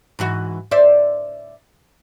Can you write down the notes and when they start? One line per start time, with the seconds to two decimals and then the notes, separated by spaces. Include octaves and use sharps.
0.19 G#2 E3 F#4
0.71 C5 D5 E5